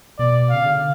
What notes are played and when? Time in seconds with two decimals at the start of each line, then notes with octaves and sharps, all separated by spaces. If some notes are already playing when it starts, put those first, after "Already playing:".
0.18 B2 D5
0.50 C#3 F5
0.65 D3